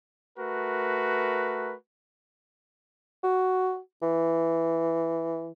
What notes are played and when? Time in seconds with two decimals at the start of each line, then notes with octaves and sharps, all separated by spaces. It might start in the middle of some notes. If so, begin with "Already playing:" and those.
0.38 A3 F#4 A#4 B4
3.24 F#4
4.02 E3